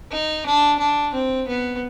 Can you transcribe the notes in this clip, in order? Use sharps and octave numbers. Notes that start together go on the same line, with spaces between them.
D#4
D4
D4
C4
B3